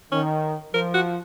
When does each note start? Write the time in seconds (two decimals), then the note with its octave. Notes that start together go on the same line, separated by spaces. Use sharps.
0.12 D#3 C#4
0.74 F3 A#4
0.94 F#4